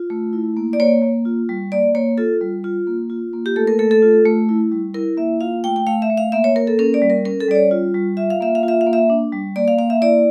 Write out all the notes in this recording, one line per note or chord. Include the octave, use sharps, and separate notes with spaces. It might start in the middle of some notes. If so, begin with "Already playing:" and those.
Already playing: F4
A3
E4
A#3
D5
A#3 C#5
A#3
F4
G3
A#3 D5
A#3 C#5
F4 A4
G3
F4
A#3
F4
A#3
G4
A3 A4
A#4
A3 A4
A4
F4
A3
E4
G3
E4 A#4
A#3 E5
F4 F5
A3 G5
G5
A3 F5
E5
A3
F5
A#3 E5
C#5
A#3 A#4
A4
C#4 A#4
D5
G3
A#4
C#4 A#4
A4
G3 D5
C#5
F4
G3
F4 E5
F5
A#3 E5
F5
F4
E5
F5
A#3
E5
D4
G3
A#3 D5
F5
A#3 F5
E5
E4 D5